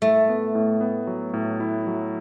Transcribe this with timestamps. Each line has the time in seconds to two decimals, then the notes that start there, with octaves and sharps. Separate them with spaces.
0.02 A2 A3
0.29 B3
0.55 A2
0.81 B3
1.07 F#3
1.34 A2
1.60 E4
1.87 F#3